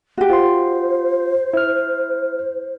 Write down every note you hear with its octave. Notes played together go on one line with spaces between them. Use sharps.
F#4 G4
F4 C5 C6
E4 F6